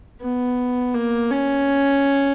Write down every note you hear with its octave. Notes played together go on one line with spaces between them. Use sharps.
B3
A#3
C#4